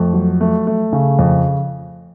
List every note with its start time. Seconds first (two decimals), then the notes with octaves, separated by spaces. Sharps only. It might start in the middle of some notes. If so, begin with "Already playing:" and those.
Already playing: F2 A3
0.14 F#3
0.41 A3
0.67 A3
0.93 C#3
1.19 F2